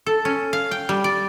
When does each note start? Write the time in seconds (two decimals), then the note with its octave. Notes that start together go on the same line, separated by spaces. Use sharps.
0.06 A4
0.25 C#4
0.53 F5
0.71 G5
0.89 G3
1.04 D5